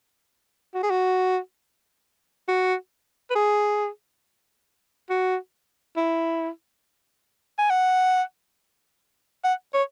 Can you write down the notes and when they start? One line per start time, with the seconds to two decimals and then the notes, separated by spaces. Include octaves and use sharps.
0.75 F#4
0.83 G#4
0.90 F#4
2.48 F#4
3.30 B4
3.35 G#4
5.10 F#4
5.97 E4
7.58 G#5
7.70 F#5
9.44 F#5
9.74 C#5